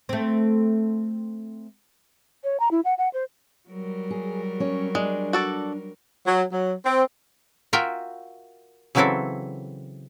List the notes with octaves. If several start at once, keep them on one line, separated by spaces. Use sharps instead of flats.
A3 C4
C#5
A#5
E4
F#5
F#5
C5
F#3 G3 A#4
G#4
C#4 C#5
G#3 D4
F#4 A4 D5
F#3
F#3
C4
F4 F#4 A#4 E5 G5
C#3 E3 F#3 C4 E4 A4